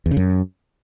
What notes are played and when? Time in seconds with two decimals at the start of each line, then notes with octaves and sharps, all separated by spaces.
0.06 E2
0.11 C#3
0.17 F#2